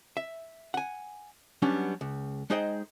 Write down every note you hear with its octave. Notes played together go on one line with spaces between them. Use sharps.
E5
F#5 G#5
F#3 G3 B3 C#4 D4
C#2
G#3 D#4 G#4 C5 D#5 G5